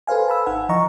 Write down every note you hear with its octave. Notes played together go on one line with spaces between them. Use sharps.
A4 B4 C5 F5 G#5
A5 B5 E6
G#1 D#4 F#5 G#5
E3 F3 D#5 A#5 C#6